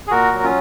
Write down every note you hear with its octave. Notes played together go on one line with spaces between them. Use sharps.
G#4
A#2 F#4 A#4
F#3
C#4 F4